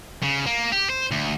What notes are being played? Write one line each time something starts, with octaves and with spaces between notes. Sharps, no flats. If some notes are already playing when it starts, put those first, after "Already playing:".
C#3
A#3
G4
C5
D2